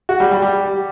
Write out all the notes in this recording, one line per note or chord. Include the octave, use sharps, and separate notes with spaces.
F#4
G3
G3
G3